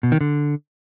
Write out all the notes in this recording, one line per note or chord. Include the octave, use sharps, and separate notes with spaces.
B2
D#3
D3